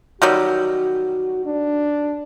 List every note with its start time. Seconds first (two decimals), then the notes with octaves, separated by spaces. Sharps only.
0.22 D#3 F#3 G3 F#4
1.46 D4